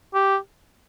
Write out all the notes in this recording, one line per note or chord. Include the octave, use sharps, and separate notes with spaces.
G4